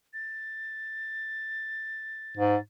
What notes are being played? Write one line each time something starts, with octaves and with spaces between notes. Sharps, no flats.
A6
G#2